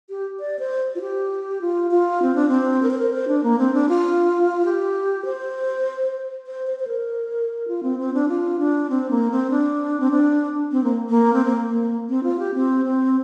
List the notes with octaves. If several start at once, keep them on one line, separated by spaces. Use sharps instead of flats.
G4
D5
C5
F4
G4
F4
F4
C4
D4
C4
A#4
C5
A#4
C5
D4
A#3
C4
D4
F4
G4
C5
C5
C5
C5
A#4
F4
C4
C4
D4
F4
D4
C4
A#3
C4
D4
C4
D4
C4
A#3
A#3
C4
A#3
A#3
C4
F4
G4
C4
C4